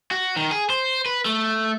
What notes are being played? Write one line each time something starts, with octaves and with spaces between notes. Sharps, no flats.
F#4
D#3
G#4
C5
B4
A3